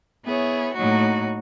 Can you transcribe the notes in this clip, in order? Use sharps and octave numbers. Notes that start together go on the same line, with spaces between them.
B3 E4 G#4 C#5
A2 F#3 A#3 D#4 F#4